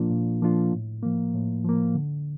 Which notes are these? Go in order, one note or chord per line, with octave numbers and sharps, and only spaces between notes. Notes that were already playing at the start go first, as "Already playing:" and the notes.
Already playing: A#2 F3 A#3 D4 F4
A#2
F3 A#3 D4 F4
A2
F3 A#3
A2
F3 A#3
D3